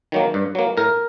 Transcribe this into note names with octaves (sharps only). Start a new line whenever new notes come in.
D#3 F#3 A#3
G2
F#3 A#3
A2 A#4